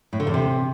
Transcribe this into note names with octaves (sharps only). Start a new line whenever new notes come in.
A2
D3
E2
C3